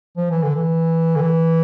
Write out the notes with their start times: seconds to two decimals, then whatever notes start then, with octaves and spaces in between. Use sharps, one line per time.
0.17 F3
0.30 E3
0.43 D3
0.55 E3
1.15 D3
1.21 E3